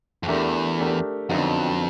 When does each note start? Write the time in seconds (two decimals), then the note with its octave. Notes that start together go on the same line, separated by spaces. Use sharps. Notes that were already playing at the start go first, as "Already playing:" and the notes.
0.23 F2
0.28 E2 A3 D4 G4 A#4
0.79 A3 D4 G4 A#4
1.29 F2 D3 F#3 B3 D#4 F#4